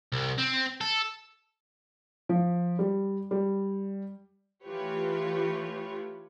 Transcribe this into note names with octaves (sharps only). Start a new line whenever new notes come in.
C2
C4
A4
F3
G3
G3
E3 A3 F4 G4 B4 C#5